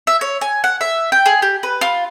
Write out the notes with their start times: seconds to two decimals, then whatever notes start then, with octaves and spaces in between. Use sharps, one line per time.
0.07 E5
0.21 C#5
0.41 G#5
0.64 F#5
0.81 E5
1.12 G5
1.26 G#4
1.42 G4
1.63 B4
1.81 F4